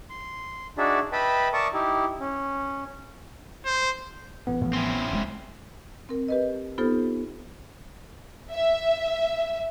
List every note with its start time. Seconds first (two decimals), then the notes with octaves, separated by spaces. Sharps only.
0.10 C6
0.78 D4 D#4 F#4 G#4 D5 E5
1.12 B4 D#5 E5 G5 A5 B5
1.53 A#4 D5 E5 A5 C#6 D#6
1.73 D#4 E4 G4
2.20 C#4
3.65 C5
4.47 A1 B3
4.62 A2 F3
4.73 C4 C#4 E4
5.11 D1 F3 G#3
6.09 C4 A#4
6.28 G4 B4 D#5
6.78 B3 D#4 F4 G4 A4 C5
8.50 E5